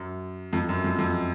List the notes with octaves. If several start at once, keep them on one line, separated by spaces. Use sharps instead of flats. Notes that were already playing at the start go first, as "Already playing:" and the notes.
Already playing: F#2
F2
F#2
F2
F2